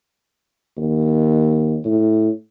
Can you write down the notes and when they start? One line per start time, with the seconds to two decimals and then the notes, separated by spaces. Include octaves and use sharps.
0.77 D#2
1.85 A2